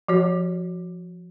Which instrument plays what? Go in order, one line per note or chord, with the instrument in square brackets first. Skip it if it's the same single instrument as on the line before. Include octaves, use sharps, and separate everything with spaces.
[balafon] F3 F#4 C#5